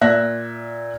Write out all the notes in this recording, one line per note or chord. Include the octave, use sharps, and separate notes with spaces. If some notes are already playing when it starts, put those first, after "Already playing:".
A#2 E5 F#6 A#6